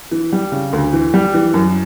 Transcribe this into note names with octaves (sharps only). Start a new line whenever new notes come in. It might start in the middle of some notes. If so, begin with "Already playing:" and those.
E3
G3
C#3
D2
E3
G3
E3
F#2